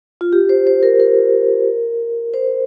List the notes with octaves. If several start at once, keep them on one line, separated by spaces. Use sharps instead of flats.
F4
G4
C5
C5
A#4
A#4
C5